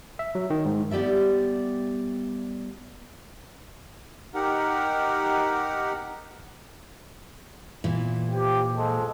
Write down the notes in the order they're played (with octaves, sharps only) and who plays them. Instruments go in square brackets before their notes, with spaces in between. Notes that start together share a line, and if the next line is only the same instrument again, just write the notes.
[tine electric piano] E5
F#3
D#3
G#2
[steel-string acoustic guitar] G3 B3 G4 D5 E5
[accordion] D#4 G4 A#4 F#5
[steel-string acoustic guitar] A#2 E3
[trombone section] F3 G4
F3 G#3 A4